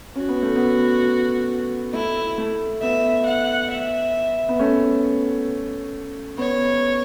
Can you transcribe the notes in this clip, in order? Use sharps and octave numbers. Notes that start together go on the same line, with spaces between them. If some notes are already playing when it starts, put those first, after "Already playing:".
C#4 F#4
B3
A3
B3
A3 E4
A3
B3 E5
F#5
E5
B3
A3 C#4
B3 C#5